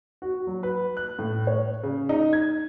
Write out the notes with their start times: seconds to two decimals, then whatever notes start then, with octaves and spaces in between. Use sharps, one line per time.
0.22 F#4
0.47 F#3
0.63 B4
0.97 F#6
1.19 A2
1.47 C#5
1.83 C#3
2.09 D#4
2.33 G#6